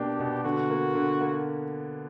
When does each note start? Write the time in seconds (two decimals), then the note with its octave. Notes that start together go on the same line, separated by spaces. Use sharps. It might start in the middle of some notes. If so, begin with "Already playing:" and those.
Already playing: B2 A#3 D4 G4
0.20 B2
0.44 D3 F#4
0.70 A#3
0.95 D3
1.21 A#3